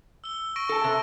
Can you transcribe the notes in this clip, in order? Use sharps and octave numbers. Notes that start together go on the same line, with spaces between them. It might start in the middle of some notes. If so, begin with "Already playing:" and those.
E6 G7
C#6 A#6 D7
A4 A5
C3